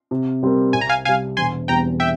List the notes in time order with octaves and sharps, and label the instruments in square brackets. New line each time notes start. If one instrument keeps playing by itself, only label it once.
[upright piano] C3
G3 C4 G4 A#4
[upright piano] C2 [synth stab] G#5
[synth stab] A#5
F5 G#5
[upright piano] C3 G3 [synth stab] F5 G#5
[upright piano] E1 [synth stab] G#5 C6
[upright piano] E2 E3 G3 C4 [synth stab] G5 A#5
[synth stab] E5 G5